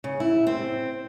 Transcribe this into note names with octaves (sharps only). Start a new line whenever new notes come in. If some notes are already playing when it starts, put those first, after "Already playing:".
C#3
E4
C4